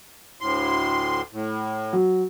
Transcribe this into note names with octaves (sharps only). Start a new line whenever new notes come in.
D2 A2 C6
A2
F#3